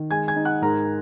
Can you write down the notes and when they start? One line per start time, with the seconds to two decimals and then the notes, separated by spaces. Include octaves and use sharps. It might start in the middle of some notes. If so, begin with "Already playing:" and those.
Already playing: D#3
0.11 G#3 G#5 G#6
0.28 G#5 G#6
0.36 D#4
0.45 F#5 F#6
0.62 G#2 A#4 A#5